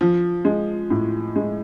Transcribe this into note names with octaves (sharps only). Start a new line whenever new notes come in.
F3
G#3
A2
G#3